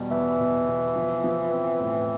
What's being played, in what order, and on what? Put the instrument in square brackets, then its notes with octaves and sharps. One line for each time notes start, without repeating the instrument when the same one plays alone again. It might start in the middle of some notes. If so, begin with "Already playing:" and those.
Already playing: [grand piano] E2 B2 G3
[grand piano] E2 [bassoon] E3
[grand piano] B2
B2
F3
F3
C4
A2